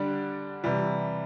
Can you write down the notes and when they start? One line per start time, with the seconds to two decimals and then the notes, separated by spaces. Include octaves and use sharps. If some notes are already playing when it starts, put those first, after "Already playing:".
Already playing: D3 G3 D4
0.64 C3 E3 G3